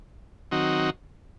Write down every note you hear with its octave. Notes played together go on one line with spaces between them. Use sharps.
D#3 F#3 C4 D#4 F#4